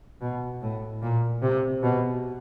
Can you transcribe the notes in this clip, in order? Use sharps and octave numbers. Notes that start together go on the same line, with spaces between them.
B2
A2
A#2
C3
B2